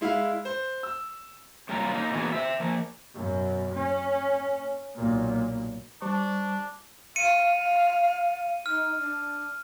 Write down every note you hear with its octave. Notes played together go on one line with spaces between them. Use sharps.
G#3 E4 F5
C5
E6
F#2 C3 G3 A#3 F4 A#5
A#3 D#4
B2 E3 A#3 B3 F#4 G#4
C5 E5
F3 A#3
F#2 B2
C#4
B1 A#2
G3 D4 C5 C#6
F5 C#7 D#7
D#4 F6
D4